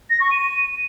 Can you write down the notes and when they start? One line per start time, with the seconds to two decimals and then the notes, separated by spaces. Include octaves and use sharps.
0.10 A#6
0.20 C#6
0.31 D#7